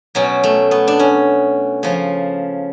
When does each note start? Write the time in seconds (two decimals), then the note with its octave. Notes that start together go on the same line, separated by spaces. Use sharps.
0.15 B2 F#3 C#4
0.44 A3
0.71 B3
0.87 D4
0.99 C#4
1.83 C#3 F3